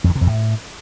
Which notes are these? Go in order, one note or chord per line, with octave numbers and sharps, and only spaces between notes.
F2
D#3
C3
F2
A2